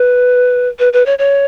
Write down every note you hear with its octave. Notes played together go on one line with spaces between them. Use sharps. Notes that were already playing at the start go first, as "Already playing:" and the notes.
Already playing: B4
B4
B4
C#5
C#5